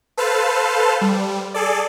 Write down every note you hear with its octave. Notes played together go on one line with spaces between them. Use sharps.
A4 B4 C5 F5 A5
G3
G#4 A4 D5